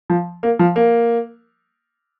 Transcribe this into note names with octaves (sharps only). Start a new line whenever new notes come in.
F3
A#3
F3
A#3